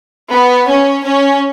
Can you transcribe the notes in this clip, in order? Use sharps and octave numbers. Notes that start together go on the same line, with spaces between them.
B3
C#4
C#4